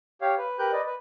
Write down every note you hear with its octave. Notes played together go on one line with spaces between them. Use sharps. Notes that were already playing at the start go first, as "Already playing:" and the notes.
G4 C#5 F5
B4
G4 A#4 B4 F#6 G6
B4 D5 D#5
B4